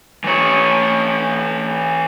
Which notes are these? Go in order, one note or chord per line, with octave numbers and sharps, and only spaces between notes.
E3 C#5